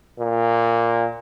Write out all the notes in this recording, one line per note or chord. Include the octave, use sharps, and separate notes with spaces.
A#2